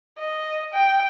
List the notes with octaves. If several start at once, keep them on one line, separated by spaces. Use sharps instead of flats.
D#5
G5